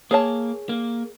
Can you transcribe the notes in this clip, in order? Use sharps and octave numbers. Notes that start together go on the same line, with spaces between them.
A#3 G#4 C#5 A5
A#3